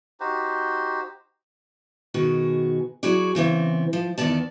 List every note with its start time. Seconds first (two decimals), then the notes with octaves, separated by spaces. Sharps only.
0.20 D#4 F#4 G4 C5
2.14 B2 D#3 F#4 G#4
3.03 F#3 E4 F#4 G#4 D5
3.35 C#3 E3 B3 C4
3.93 F3
4.18 E2 D#3 F#3 B3 D5 A5